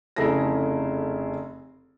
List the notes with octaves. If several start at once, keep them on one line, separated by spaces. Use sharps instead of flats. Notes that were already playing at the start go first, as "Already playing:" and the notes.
F1 C#3 E4 G#4 A4 A#6